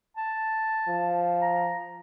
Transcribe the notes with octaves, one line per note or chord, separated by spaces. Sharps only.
A5
F3
A#5